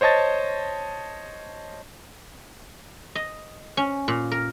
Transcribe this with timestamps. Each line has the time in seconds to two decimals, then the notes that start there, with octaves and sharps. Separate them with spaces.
0.01 C5 C#5 D#5 A5 A6
3.15 D#5
3.77 C#4
4.08 A#2
4.31 A#4